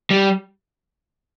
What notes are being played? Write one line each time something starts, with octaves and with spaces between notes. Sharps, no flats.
G3